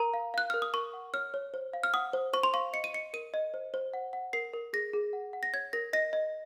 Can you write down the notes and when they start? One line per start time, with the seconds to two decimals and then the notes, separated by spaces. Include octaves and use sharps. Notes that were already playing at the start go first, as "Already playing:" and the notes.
Already playing: A#4 A#5
0.14 F5
0.34 F5 F#6
0.50 A#4 F6
0.62 D#6
0.73 A#4 C#6
0.94 F#5
1.14 C#5 F6
1.34 C#5
1.54 C5
1.73 F5
1.84 F6
1.94 F#5 D#6
2.13 C5
2.33 C5 C#6
2.43 C6
2.53 F5 C#6
2.73 D#5 C#7
2.84 D#7
2.93 D#5 C#7
3.14 A#4 D#7
3.34 D#5
3.54 C5
3.74 C5
3.94 F#5
4.13 F#5
4.33 A#4 C7
4.53 A#4
4.73 G#4 A#6
4.93 G#4
5.13 F#5
5.33 F#5
5.43 A#6
5.53 C#5 G#6
5.73 A#4 A#6
5.93 D#5 A#6
6.13 D#5